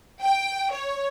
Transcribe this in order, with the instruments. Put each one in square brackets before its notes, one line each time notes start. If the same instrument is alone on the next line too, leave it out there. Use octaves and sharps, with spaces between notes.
[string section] G5
C#5